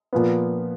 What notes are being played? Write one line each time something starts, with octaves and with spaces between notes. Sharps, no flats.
A#2 F3 B3